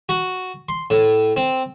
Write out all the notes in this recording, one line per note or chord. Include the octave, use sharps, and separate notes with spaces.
F#4
C6
A2
C4